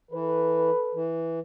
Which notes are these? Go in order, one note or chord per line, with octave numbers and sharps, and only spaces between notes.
E3 A4 B4
E3